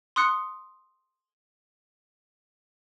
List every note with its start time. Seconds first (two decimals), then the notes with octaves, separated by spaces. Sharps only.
0.16 C6 D#6 F#6 C#7